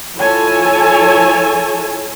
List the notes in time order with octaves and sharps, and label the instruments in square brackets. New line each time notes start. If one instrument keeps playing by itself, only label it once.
[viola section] F3 E4 A4 C#5 G#5 A5